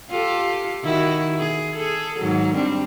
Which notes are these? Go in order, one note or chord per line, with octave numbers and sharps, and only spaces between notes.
F4 G4 A4
D#3 E4 F#4
G#4
G#4 A4
G#2 D#3 F#3
G3 C4 D4